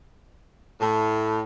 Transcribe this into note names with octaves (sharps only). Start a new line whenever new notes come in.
A2